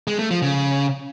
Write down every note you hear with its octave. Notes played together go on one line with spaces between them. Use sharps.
G#3
A3
F3
C#3